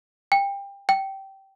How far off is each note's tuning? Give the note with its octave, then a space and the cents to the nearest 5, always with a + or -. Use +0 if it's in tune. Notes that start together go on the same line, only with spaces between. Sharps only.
G5 +25
G5 -15